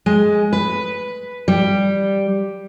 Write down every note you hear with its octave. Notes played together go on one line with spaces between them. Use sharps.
G#3
B4
G3